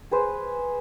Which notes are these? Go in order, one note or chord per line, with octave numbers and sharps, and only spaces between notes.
G#4 B4 C5